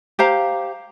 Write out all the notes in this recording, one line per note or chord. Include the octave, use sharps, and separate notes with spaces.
G4 C5 F5 A#5